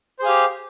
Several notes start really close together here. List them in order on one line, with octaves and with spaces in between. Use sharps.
C5 G#4 F5 G4